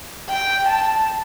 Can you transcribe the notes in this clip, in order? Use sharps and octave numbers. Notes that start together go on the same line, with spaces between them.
G5
A5